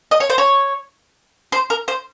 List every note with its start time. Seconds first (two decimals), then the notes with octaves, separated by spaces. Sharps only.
0.11 D#5
0.20 C#5
0.30 C5
0.38 C#5
1.52 C5
1.70 A#4
1.88 C5